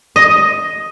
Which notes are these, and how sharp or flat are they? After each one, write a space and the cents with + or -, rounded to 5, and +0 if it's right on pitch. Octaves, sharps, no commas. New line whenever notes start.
D#5 +5